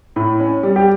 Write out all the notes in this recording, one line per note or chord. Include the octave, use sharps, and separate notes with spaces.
A2
C#4
G3
G4